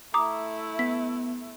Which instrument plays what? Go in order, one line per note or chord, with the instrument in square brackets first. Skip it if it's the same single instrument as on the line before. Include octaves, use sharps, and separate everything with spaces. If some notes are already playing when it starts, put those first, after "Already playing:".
[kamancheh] A3 E4 [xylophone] A#5 D6 D#6
[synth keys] B3 [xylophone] B6